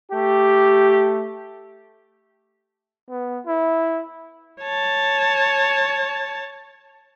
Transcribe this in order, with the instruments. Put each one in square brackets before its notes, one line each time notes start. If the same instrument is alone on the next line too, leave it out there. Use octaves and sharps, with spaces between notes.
[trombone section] A3 G4
[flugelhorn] B3
E4
[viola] C#5 A5